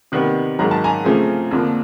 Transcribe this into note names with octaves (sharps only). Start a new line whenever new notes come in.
C3 D#3 G3 B3
G#2 D#3 F#3 A#5
A5
G#5 A#5
C#3 F3 A3 C4
F2 D3 F3 A#3